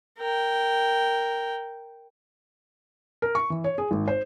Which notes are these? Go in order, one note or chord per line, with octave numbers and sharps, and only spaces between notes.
A#4 G5
A#4
C#6
E3
C#5
G#4
G#1
C5